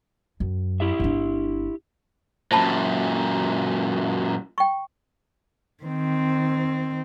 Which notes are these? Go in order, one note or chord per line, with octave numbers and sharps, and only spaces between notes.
F#2
E4 G4 E5
G1 D4
F#2 A#2 C5 A5 B5
G5 C#6
D#3 C4